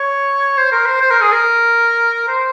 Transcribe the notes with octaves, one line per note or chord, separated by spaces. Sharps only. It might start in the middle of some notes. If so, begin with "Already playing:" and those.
Already playing: C#5
C5
A#4
C5
C5
A#4
G#4
A#4
C5